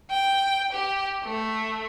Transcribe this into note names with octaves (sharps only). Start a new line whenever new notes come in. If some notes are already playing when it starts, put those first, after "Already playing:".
G5
G4
A3